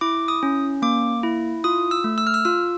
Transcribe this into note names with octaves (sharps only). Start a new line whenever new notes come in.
E4 D6
D#6
C#4
A#3 D6
E4
F4 D#6
E6
A3
E6
F6
E6
F4 E6